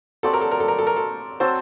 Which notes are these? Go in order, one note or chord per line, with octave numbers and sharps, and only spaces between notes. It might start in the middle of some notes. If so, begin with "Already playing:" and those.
F#3 C4 G4 A4 D5
A#4
A4
A#4
A4
A#4
A4
A#4
A4
F#3 C4 F#4 A4 C5